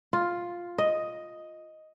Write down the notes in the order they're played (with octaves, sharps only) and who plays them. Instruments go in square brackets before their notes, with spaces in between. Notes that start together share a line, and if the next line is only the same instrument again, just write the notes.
[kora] F4
D#5